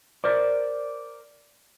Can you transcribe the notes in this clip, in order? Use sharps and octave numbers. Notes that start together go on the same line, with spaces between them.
A#4 C5 D5